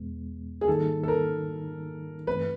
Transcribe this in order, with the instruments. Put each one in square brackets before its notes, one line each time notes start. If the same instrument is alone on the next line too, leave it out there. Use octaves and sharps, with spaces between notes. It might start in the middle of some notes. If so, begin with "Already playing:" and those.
Already playing: [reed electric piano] E2 B2 G#3 B3
[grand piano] G#4
[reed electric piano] G#2 D#3 G3 A#3 D#4 [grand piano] A4
[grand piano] A4
A#4
[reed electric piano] G2 E3 A3 C4 [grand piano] B4